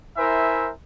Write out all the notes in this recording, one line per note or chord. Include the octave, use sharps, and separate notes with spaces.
E4 A#4 C5 E5 G#5